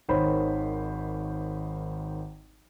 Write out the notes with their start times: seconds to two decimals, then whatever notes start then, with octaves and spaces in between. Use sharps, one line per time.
0.09 G#1 D#3 C5 C#5 B5